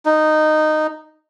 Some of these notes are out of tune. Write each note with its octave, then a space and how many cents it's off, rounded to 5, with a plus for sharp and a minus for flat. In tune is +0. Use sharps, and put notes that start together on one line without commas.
D#4 -10